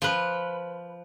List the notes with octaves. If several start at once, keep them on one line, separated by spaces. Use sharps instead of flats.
F3 B4